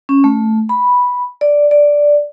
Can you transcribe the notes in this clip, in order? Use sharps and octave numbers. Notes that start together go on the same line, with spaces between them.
C#4
A3
B5
D5
D5